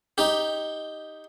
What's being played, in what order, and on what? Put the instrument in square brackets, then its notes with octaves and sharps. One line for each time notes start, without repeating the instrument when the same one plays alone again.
[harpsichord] D#4 G4